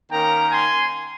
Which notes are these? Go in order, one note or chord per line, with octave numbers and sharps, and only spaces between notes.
D#3 A#3 C#4 G5 A#5
G#5 C6